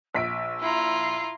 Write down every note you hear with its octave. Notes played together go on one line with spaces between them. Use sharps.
A#1 E6 B6 D7
E4 F4 A#5